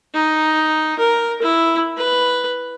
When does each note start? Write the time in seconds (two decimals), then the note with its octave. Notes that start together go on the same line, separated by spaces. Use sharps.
0.14 D#4
0.99 A#4
1.42 E4
1.97 B4